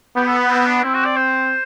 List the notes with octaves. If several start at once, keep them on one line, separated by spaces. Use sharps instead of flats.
B3 G4
A4
B4
C4
D4
C4 E4
F#4
D5
C5